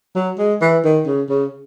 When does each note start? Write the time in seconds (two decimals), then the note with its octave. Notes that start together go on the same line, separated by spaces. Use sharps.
0.16 F#3
0.39 G#3
0.62 E3
0.85 D#3
1.07 C#3
1.30 C#3